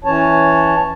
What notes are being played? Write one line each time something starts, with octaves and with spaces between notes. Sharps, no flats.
E3 C#4 C#5 A5